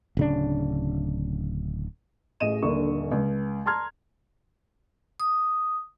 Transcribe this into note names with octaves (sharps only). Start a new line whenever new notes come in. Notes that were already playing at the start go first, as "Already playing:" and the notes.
D1 C#3 D4
A1 G#4 D#5 D#7 E7
D#1 A#1 D3 A#4 C#6
C#2
A5 A#5 C6 F6 G#6
D#6